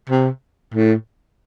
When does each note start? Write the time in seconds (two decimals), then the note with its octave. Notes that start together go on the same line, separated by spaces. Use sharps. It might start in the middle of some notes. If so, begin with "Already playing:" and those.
0.09 C3
0.74 A2